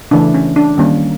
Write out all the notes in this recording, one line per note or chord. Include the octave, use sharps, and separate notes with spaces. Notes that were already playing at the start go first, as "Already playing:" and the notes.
C#3 E3 A3 D4
C#4
D4
D#3 G3 A#3 C#4